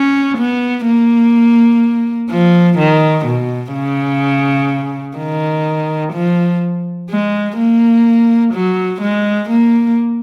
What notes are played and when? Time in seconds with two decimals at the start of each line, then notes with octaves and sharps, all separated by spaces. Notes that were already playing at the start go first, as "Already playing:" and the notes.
Already playing: C#4
0.38 B3
0.86 A#3
2.30 F3
2.78 D#3
3.26 B2
3.73 C#3
5.17 D#3
6.13 F3
7.10 G#3
7.58 A#3
8.54 F#3
9.01 G#3
9.49 A#3